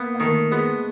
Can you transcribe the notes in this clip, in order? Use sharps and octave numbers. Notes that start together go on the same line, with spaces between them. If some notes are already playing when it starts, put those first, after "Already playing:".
Already playing: A#3 B3
A#3
D#3 A3
G#3 B3